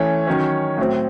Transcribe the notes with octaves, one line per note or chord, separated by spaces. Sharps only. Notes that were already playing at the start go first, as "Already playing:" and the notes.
Already playing: E3 A3 C#4 C#5
D#3 F#3 C#4
A2 F#3 C4